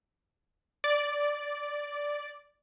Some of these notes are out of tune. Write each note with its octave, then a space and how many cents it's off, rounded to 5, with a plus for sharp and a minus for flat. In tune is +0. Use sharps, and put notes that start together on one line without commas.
D5 -5